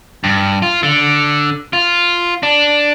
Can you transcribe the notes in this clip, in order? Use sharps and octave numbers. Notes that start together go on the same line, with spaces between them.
G2
F4
D3
F4
D4